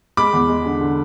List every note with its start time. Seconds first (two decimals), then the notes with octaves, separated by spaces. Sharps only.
0.17 G#3 B5 D6
0.33 E2
0.49 G#3
0.66 D3
0.81 D3